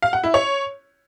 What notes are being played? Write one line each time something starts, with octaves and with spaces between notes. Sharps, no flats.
F5
F#5
E4
C#5